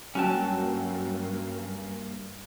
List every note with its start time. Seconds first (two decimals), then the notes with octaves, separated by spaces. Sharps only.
0.15 G2 F#3 A#3 C#4 F#4 G5 A5